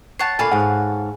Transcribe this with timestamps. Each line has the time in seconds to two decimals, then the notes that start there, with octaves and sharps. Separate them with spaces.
0.19 C#5 F#5 A5 C7
0.39 A#2 D3 A4 C#5 F5 G#5 B5 C7
0.52 G#2 G#4 F#5 G#5 C#6 F#6